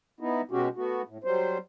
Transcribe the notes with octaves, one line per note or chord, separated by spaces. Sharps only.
B3 D#4 E4
B2 G#3 C#4 F#4 G4
A3 B3 F#4
A2
F#3 G3 C5